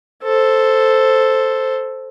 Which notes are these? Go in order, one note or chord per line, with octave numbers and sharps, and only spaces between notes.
A4 C5